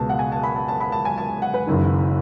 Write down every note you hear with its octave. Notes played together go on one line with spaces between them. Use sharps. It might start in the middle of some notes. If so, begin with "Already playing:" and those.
Already playing: C#2 B2 A5
F#5
G#5
A5
B5
A5
A5
B5
A5
G#5
A5
F#5
B4
F#1 F#2 D#3